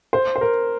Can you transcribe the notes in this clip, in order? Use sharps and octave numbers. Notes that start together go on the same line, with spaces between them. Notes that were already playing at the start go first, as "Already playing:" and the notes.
C5
C5
A#4